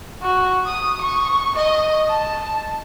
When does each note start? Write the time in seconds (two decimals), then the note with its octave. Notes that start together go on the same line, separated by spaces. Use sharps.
0.22 F#4
0.67 D#6
1.01 C#6
1.56 D#5
2.09 A5